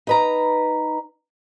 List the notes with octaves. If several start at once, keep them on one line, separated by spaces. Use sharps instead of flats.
D#4 B4 A#5